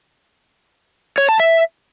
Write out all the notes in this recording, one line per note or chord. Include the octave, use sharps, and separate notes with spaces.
C#5
A5
E5